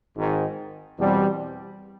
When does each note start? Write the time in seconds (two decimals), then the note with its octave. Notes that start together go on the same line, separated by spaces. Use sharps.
0.15 G#1 G#2 D#3
0.98 E2 B2 G3 C4